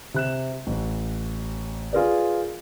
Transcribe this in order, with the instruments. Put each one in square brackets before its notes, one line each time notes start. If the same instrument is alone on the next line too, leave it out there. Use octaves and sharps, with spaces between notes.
[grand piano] C3 F#6 E7
A1
F4 G#4 A#4 B4 D5